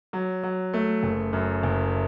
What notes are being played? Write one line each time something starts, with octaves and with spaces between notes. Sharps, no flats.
F#3
F#3
A3
F#1
F#2
F#1